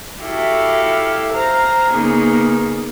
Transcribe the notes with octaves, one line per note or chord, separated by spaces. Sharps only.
E4 F#4 G4 A4 F5
C5 F5 A#5
C#3 A#3 B3 D#4 G#4